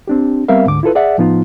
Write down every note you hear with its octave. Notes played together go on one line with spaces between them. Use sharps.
C4 D4 G4
G3 B3 C4 A#4 E5 F5
D2 G#2 D3 D6
E4 F4 A4 B4
G#4 D5 E5 F#5
A2 F3 B3 D#4 F4